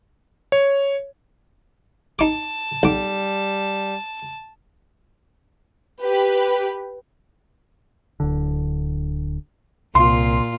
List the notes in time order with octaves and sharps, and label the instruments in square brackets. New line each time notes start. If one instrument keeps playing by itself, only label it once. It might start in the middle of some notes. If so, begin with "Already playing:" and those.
[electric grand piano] C#5
[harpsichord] D#4 D6 [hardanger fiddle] A5
[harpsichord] B1 D6 [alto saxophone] G3
[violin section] G4 B4
[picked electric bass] D1 D3
[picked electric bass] C2 [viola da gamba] A#2 F4 [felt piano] C6